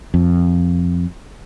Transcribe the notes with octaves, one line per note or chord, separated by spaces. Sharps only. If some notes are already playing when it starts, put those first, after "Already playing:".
F2